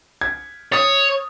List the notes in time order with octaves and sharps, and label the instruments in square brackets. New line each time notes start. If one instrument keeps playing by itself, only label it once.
[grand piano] G#6
[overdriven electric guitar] C#5 [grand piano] D#6 A6